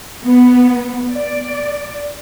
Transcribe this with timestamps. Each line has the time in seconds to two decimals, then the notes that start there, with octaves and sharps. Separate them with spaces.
0.24 B3
1.11 D5